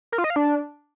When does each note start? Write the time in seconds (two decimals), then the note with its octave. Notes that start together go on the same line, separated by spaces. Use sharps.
0.12 A#4
0.18 F4
0.24 D#5
0.30 F5
0.36 D4